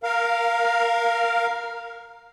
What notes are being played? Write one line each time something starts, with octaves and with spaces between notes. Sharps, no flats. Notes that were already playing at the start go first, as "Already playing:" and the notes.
A#4 F5